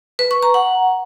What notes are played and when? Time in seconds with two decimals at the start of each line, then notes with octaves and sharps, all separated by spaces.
0.19 B4
0.31 C#6
0.43 A#5
0.54 F#5